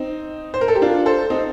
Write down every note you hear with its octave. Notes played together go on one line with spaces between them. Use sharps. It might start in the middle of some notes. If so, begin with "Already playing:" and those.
Already playing: C4 D#4
C5
A#4
A4
G4
D4 F4
A4 C5
C4 D#4